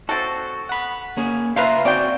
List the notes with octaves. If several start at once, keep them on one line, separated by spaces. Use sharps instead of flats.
C4 F#4 A4
F#5 B5
A#3 C#4 G#4
C#3 F4 B4 E5 F5 A#5
C4 C#4 F#4 D5 G5